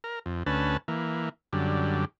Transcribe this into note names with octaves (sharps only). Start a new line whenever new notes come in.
A#4
F2
D2 C#4 B4 A5
E3 A#3
F#2 D3 G3